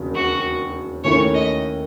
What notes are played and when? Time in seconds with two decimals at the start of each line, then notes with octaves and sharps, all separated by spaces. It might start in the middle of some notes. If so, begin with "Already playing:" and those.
Already playing: E1 D#2 C#3
0.15 F#4
1.04 D#2 D#3 A3 C#4 E4 C#5
1.34 D#5